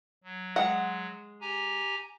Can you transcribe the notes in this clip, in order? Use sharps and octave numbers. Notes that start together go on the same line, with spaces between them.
F#3
G#3 F#5
G4 G#5 A#5